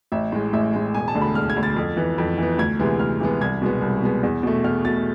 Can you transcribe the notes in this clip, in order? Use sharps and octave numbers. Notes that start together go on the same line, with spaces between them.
A1 E5
A2 G#3
A1 E5
A2 G#3
E1 G#5
A5
D2 D3
B5
E1 F6
G#6
D2 D3
A6
F2
E3 B3
F2
E3 B3
D2 G#6
C3 E3 G#3 B3
D2 F6
C3 E3 G#3 B3
C2 G#6
B2 G#3 B3
C2
B2 G#3 B3
E2
B2 A3
E2 F6
B2 A3 A6